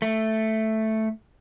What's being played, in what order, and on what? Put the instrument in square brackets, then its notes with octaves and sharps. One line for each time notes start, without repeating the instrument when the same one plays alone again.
[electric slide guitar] A3